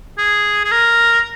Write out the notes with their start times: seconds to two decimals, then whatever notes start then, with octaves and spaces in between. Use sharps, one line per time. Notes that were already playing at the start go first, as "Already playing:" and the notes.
0.18 G#4
0.65 G#4
0.72 A#4